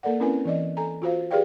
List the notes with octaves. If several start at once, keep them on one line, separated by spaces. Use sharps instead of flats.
A#3 A4 A#4 D5 F#5
C4 C#4 E4 A#4 B4 G#5
E3 D5 D#5
A4 G#5 A#5
F4 F#4 C5 F5
G4 G#4 B4 D5 F5 G5